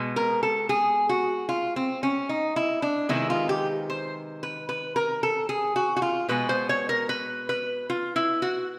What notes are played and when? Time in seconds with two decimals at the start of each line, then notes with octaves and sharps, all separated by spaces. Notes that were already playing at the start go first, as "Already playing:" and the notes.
Already playing: B2 G#3 B3
0.16 A#4
0.43 A4
0.69 G#4
1.09 F#4
1.49 F4
1.76 C4
2.03 C#4
2.29 D#4
2.56 E4
2.82 D4
3.09 C3 D#3 G#3 B3 E4
3.30 F4
3.49 G4
3.90 C5
4.43 B4
4.69 B4
4.96 A#4
5.23 A4
5.49 G#4
5.76 F#4
5.96 F#4
6.02 F4
6.29 B2 G#3 B3 B4
6.49 C5
6.69 C#5
6.89 A#4
7.09 B4
7.49 B4
7.90 F4
8.16 E4
8.42 F#4